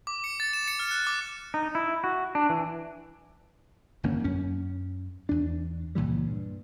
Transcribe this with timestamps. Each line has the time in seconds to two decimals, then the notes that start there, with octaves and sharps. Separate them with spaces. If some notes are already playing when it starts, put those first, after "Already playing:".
0.07 D6
0.24 C#7
0.40 A6
0.53 E7
0.68 C#7
0.79 F6
0.91 F#6
1.07 D6
1.54 D#4
1.75 E4
2.04 F#4
2.35 D4
2.49 E3
4.03 G1 F2 A#3 C#4
4.24 F#2 C#4
5.29 E2 D4
5.95 C#2 A#2 E3 G3
6.27 G2